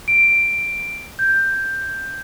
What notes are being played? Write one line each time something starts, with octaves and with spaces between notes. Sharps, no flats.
D7
G6